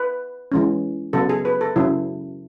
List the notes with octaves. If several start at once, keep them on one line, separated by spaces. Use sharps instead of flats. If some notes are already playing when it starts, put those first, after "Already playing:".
Already playing: B4
E3 G#3 C#4
C#3 F#3 B3 A4
G#4
B4
A4
C#3 F#3 C#4 E4